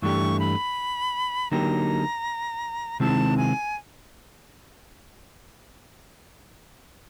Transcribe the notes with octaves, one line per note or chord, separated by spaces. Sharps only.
G2 E3 A3 D4 G4 C#6
B5
D3 F#3 A#3 D#4 G4 A#5
C3 D#3 G#3 C4 E4 A5
G#5